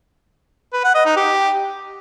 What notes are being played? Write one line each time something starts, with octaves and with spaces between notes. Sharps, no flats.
B4
F#5
D#5
D#4
G4